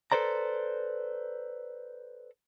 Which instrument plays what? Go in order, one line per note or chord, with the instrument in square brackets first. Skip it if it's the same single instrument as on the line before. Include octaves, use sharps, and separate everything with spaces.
[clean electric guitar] A4 B4 C5 D5 A#5